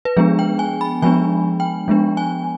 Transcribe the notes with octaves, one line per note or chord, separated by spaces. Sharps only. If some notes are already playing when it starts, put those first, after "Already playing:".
B4
F3 G#3 B3 D4 G#4
G5
G#5
B5
F3 G#3 B3 D4 G#5
G5
F3 G#3 B3 D4
G#5